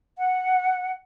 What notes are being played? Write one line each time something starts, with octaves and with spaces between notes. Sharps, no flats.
F#5